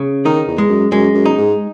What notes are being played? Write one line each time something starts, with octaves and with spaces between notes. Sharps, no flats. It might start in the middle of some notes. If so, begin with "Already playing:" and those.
Already playing: C#3
D#3 D#4
E2
G#3
F#2
F#2 G#3
F#2
D#4
G#2